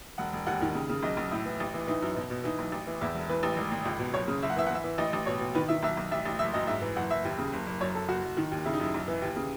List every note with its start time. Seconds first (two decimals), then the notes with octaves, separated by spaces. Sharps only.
0.18 E1 F#5
0.33 E1
0.46 D#2 F#5
0.61 D#3
0.75 C#3
0.89 C#3
1.03 B1 D#5
1.17 B1
1.31 A2 E4
1.46 E3
1.60 A1
1.74 E3
1.87 E3 D#4
2.02 F#2
2.16 B2
2.30 B2
2.44 E3 D#4
2.59 B1
2.72 A1
2.87 E3
3.01 E2 E4
3.14 E1
3.29 E3 B4
3.43 A1
3.57 G#1
3.71 G#1
3.85 C#2
3.99 B2
4.14 F#1 C#5
4.27 C#3
4.43 F#1 E5
4.50 F#5
4.56 E3 E5
4.67 F#5
4.71 E3 E5
4.84 E3
4.98 A1 D#5
5.13 A1
5.26 B2 C#5
5.40 B2
5.55 D#3 B4
5.68 D#3 E5
5.83 B1 E5
5.97 B1
6.11 A1 E5
6.26 A1
6.39 F#1 E5
6.54 F#2 D#5
6.67 G#2 E5
6.81 E3
6.96 F#1 F#5
7.10 F#1 E5
7.25 D#2
7.38 C#3
7.53 F#1
7.67 F#1
7.81 F#2 C#5
7.95 F#2 A4
8.08 F#1 F#4
8.23 F#1
8.37 D#3
8.52 D#2
8.65 C#3 E4
8.73 D#4
8.80 F#2 E4
8.94 B1
9.08 E3
9.22 D#2
9.36 C#3